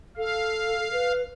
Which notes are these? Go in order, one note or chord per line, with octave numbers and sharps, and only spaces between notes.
A4 F5
B4